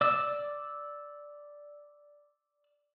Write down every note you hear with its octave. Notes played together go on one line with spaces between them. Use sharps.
D5 E6